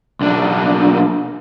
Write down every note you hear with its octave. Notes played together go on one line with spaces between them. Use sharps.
B1 D4